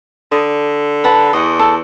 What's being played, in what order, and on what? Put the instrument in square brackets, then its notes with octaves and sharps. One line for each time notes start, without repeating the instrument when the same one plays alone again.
[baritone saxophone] D3 [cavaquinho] D#6
[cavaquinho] B4 F#5 A5
[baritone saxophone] E2 [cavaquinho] D#5 F#5
[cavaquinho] A4